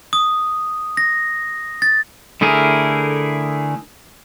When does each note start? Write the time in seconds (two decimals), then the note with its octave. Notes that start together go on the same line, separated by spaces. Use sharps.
0.13 D#6
0.97 A#6
1.82 A6
2.41 D3 A3 E4 G#4 A#4